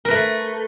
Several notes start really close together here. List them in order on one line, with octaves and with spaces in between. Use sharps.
A#4 B4 A3